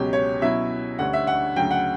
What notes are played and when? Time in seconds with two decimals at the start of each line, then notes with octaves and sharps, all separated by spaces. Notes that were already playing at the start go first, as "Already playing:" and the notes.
Already playing: C#2 B2 F#3 C#4 G4
0.13 C#5
0.42 B2 F#3 C#4 E4 E5
0.99 D2 D3 G3 C#4 F#5
1.13 E5
1.27 F#5
1.56 D2 C#3 F#3 G5
1.71 F#5